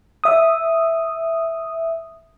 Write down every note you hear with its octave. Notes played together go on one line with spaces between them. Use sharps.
E5 D#6